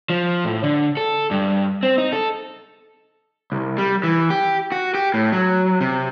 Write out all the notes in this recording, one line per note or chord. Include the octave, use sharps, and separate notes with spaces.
F3
A2
D3
A4
G2
C4
D#4
A4
C2
G3
E3
G4
F#4
G4
A2
F#3
C3